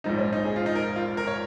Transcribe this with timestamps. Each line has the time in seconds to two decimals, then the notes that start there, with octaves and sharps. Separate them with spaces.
0.04 A#1 G#2 F3 D#4
0.18 C#4
0.33 D#4
0.45 G#4
0.56 F4
0.66 D#4
0.75 A#4
0.96 F4
1.17 A#4
1.27 C#5